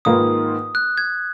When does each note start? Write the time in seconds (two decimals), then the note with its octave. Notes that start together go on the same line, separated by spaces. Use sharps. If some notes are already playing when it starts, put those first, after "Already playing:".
0.05 G#2 D#3 A#3 F4 B4 D#6
0.75 F#6
0.98 G#6